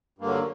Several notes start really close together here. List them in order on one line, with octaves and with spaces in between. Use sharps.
G2 A#3 D3 F#3